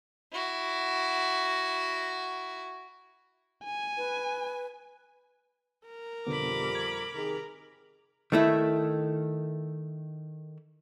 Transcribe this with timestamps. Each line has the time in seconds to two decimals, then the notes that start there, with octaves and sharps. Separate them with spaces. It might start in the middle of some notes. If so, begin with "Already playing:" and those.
0.33 E4 F#4
3.64 G#5
3.97 B4
5.86 A#4
6.27 F2 B2 D3 G3 B3 B5 D6
6.75 G#6
7.14 C3 D#3 G#4 A#4
8.32 D#3 A3 E4